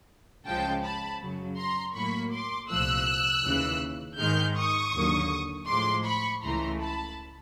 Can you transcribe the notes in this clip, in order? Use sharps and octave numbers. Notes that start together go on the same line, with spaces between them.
C#2 C#3 F3 G#3 G5 A5
A5 B5
F#2 C#3 F#3
A#5 C6
A2 F#3 A#3 B5 C#6
C6 D6
C2 A#2 F3 A3 E6 F#6
D#2 C#3 E3
G#2 D#3 G#3 F6 G6
C#6 D#6
D#2 D3 F#3 A#3
A2 F3 G#3 C6 D6
B5 C#6
C#2 C#3 E3 A3 A#5 C6
A5 B5